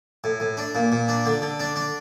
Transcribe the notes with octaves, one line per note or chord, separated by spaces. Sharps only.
A2
A2
D4
A#2
A#2
D4
D3
D3
D4
D4